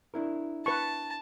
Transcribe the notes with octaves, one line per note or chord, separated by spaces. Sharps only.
D4 E4 A#4
B4 A5 C#6